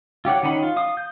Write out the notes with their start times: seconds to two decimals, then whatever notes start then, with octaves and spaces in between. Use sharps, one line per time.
0.25 F4 G4 C#5 F#5
0.43 D#3 C#4 D#4 F#5 B5
0.63 F4
0.76 F5 D#6
0.97 G6